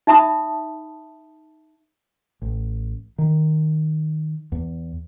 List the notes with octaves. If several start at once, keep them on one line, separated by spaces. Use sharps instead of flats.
D#4 E5 A5 B5 D#6
A1
D#3
E2